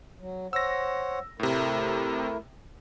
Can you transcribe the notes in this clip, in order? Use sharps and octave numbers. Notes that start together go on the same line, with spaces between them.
F#3
C5 C#5 F#5 E6 A#6
A2 C3 A3 E4 A#4